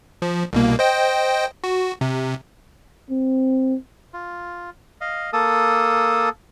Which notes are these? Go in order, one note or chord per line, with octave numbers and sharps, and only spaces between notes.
F3
C2 B2 A#3
C5 D#5 G5
F#4
C3
C4
F4
D#5 F5
A#3 A4 A5 D#6